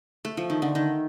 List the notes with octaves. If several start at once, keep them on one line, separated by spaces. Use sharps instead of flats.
A3
F3
D#3
D3
D#3